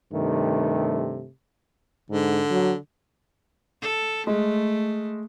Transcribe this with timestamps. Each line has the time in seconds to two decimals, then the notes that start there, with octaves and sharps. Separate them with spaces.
0.13 G2 C3 D#3 A3
2.10 G#2 D3
2.50 F#3
3.82 A4
4.27 G#3 A3